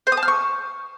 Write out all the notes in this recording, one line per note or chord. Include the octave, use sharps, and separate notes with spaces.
C5
D#6
A5
F6
C#6